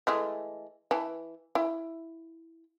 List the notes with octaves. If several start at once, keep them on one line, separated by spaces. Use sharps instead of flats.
E3 G#3 A3
E3 A5
E4